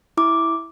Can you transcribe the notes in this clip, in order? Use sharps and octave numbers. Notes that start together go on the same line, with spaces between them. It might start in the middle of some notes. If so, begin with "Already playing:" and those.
E4 D6